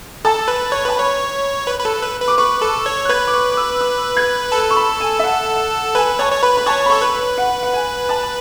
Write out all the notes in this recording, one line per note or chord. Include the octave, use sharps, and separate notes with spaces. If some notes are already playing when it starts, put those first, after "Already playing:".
A4 A5
B4
C#5
B4 A5
C#5 B5
B4
B4
A4
B4
B4
D6
B4 C#6
A4
C#5
F#6
B4 G#6
D6
C#6
D6
E6
E6
G#6
A4
C#6
B5
G#5
E5
F#5
B4 G#5
C#5 A5
C#5
B4 B5
B5
C#5 A5
B5
A4 C#6
B4
B5
F#5
F#5
G#5
A5